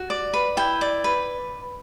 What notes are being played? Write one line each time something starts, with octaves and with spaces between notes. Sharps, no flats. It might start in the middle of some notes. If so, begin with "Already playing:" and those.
Already playing: F#4
D5
B4
E4 G5
D5
B4